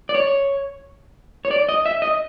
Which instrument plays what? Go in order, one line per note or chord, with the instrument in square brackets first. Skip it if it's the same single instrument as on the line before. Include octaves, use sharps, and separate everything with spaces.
[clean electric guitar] D5
C#5
C#5
D5
D#5
E5
D#5